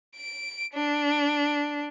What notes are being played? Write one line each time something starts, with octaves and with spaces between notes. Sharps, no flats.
D7
D4